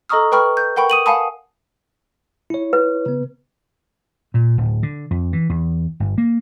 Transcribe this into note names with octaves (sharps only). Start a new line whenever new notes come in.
A4 D#5 A#5 C#6 D#6 F6
B4 G5 B5 C#6 F6
G6
A#4 F#5 G5 B5 C#6
D#6 D#7 F#7
F5 F#5 G#5 A5 B5 D#6
E4 C#5
B4
C#3 B3
A#2
D1
D3
F2
E3
E2
G1
A#3